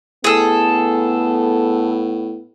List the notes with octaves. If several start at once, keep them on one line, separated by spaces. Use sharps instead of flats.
A2 B3 G#4 A4